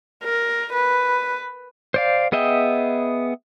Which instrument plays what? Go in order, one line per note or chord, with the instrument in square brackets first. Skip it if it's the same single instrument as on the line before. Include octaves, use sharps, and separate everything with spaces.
[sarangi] A#4
B4
[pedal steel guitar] C5 D5 F5
B3 G#4 D#5 E5 G5